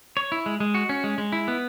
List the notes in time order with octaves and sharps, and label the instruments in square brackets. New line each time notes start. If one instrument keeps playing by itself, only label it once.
[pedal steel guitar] C#5
E4
G#3
G#3
F#4
C#4
G#3
G#3
E4
B3